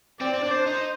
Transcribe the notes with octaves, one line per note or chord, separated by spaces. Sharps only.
C4 D5
C4
D4
C5
D#4